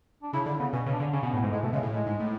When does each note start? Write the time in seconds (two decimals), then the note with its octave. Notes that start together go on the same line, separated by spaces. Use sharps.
0.22 D4
0.33 C#3 E4
0.46 D3 E4
0.60 C#3 B3
0.73 B2 C#4
0.86 C#3
0.93 D4
1.00 D3
1.13 C#3 C#4
1.23 B2
1.28 C#4
1.33 A2 B3
1.43 G#2
1.52 A2 G#3
1.63 B2 A3
1.73 C#3 G#3
1.83 A2
1.93 A2 G#3
2.06 G#2
2.20 A2